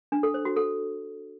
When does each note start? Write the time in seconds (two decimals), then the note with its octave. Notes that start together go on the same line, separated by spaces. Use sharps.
0.12 D4
0.23 A4
0.34 C5
0.45 F#4
0.56 A4